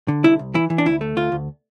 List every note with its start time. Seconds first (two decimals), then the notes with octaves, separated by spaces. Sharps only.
0.08 D3
0.24 C2 E4
0.39 C2
0.54 E3 E4
0.70 E3
0.78 D4
0.86 D2 E4
1.01 A3
1.17 D2 F4
1.32 D2